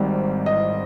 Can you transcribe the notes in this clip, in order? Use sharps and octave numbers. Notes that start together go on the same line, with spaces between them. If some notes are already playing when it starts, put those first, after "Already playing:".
Already playing: G#1 G#2 G3 C4
D#5